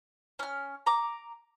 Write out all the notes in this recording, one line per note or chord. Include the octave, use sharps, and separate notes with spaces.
C#4 F6
A#5 D6